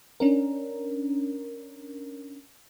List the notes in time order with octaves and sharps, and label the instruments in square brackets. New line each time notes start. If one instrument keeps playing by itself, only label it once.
[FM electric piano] C#4 D4 A#4